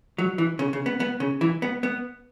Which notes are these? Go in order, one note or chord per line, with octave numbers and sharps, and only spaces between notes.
F#3
E3
C#3
C#3
B3
B3
C#3
E3
B3
B3